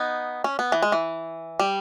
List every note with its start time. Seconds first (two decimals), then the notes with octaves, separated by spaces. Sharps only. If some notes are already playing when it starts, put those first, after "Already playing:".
Already playing: B3 D#4
0.44 C#4
0.59 B3
0.72 E3
0.82 G#3
0.92 E3
1.59 G3